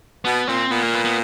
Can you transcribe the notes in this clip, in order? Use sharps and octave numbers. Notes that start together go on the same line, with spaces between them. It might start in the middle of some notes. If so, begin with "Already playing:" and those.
B2 B3
A#2 C4
A#2 B3
A#3
B3
B3